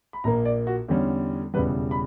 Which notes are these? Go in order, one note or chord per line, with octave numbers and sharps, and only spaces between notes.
B5
A#1 A#2 A#3 A#5
D5
F#4
E2 D3 G3 C#4
E1 E2 C#3 G3 B4
B5